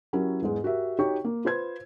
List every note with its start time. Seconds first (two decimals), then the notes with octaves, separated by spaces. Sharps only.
0.13 F#3 C#4 E4 G4 A#4
0.41 E2 G#2 G#3
0.64 F#4 G4 A#4 E5
0.99 D#4 F#4 G4 C#5 G5 C#6
1.24 A#3
1.45 F4 B4 C5 G#6